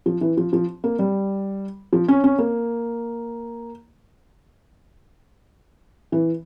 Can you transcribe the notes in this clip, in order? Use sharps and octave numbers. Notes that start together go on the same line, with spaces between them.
F3
E3
F3
F3
A#3
G3
F3
C#4
C#4
A#3
E3